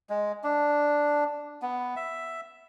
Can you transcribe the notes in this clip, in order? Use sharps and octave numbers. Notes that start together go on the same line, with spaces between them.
G#3
D4
B3
E5